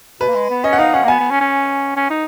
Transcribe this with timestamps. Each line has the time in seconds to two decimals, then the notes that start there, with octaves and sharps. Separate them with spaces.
0.20 B2 B4
0.29 A#3
0.35 G#3
0.50 B3
0.64 C#4 D#5
0.73 F#5
0.79 D#4 F5
0.94 C#4 F#5
1.04 A#3
1.08 B3 G#5
1.19 B3
1.30 C#4
1.41 C#4
1.96 C#4
2.10 D#4